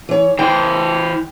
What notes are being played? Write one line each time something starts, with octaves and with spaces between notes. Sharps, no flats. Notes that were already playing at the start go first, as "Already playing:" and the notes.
E3 C#5
E3 C5 G5